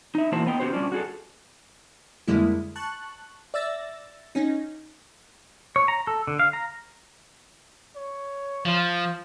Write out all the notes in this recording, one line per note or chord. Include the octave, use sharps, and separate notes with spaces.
D#4 E5
E3 A#3 E4 F#4 C5 A5
B3 D#4 G5
C#4 F#4 G4 C5
G3 C#4 D4 F4
F#4 G#4 A4
F2 D3 G3 G#3 A#3 E4
A5 C#6 F#6
D5 E5 E6 A6 A#6
C#4 D#4
C#5
A#5
A4
D3
F5
A#5
C#5
F3 F4